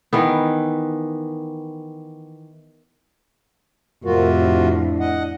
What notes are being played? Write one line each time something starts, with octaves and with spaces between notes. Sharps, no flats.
D#3 E3 B3
F2 A2 C3 F4 F#4 A#4
D4 E4
D#5 F#5